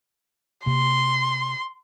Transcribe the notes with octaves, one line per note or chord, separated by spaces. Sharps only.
C3 A#3 C6